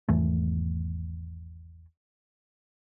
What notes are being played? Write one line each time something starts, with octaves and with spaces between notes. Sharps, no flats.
G#1 E2 E3 A3